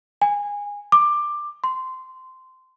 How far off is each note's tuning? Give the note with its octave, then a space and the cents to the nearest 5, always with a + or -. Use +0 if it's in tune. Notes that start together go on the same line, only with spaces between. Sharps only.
G#5 -20
D6 +15
C6 -15